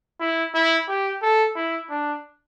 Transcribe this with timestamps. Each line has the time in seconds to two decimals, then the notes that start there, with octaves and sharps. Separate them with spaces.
0.21 E4
0.54 E4
0.89 G4
1.22 A4
1.56 E4
1.90 D4